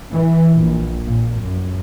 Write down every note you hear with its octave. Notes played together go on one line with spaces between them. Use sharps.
E3
A#1
A#2
F#2